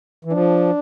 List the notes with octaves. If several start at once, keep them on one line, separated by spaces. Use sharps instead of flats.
E3
F3 D4